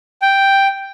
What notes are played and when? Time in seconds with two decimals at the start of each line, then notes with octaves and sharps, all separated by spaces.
0.22 G5